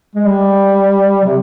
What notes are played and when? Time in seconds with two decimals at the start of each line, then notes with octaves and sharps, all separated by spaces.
0.15 G#3
0.25 G3
1.24 C3